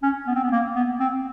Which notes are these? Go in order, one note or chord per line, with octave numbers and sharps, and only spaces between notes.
C#4
B3
C4
B3
A#3
B3
C4